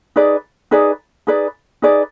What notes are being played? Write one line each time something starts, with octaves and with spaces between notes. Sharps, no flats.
D#4 G#4 B4 D5
D#4 G#4 B4 D5
D#4 G#4 B4 D5
D#4 G#4 B4 D5